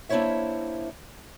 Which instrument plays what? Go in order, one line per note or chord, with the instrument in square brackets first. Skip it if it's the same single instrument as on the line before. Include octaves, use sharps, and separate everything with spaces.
[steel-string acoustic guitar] A#3 D4 E4 C5 C#5 E5